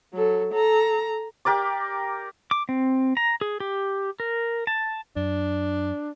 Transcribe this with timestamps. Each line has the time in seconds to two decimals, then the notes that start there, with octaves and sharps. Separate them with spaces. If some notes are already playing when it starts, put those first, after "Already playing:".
0.13 F#3 A4
0.53 A4 A#5
1.45 G4 A#4 D5 D6
2.51 D6
2.69 C4
3.17 A#5
3.41 G#4
3.60 G4
4.20 A#4
4.67 A5
5.16 F#2 D4